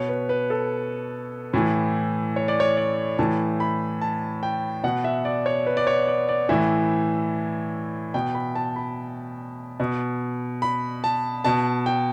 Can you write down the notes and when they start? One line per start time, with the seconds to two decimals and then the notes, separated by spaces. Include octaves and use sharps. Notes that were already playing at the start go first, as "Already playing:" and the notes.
Already playing: B2 C#5
0.09 B4
0.29 B4
0.50 A4
1.53 A2 E3
2.36 C#5
2.48 D5
2.60 C#5
2.77 D5
3.19 A2 E3 A5
3.60 B5
4.01 A5
4.43 G5
4.84 B2 F#5
5.04 E5
5.25 D5
5.46 C#5
5.66 B4
5.77 D5
5.87 C#5
6.07 D5
6.29 D5
6.49 A2 E3 E5
8.14 B2 G5
8.35 B5
8.55 A5
8.76 B5
9.80 B2
10.62 B5
11.04 A5
11.44 B2 A5
11.86 G5